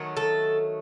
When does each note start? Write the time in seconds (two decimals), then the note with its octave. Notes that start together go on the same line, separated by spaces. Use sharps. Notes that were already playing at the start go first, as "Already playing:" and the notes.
Already playing: D#3 F#3 A3
0.17 A4